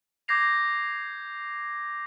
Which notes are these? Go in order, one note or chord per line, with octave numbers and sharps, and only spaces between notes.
D6 G6 G#6 A#6 C7 F7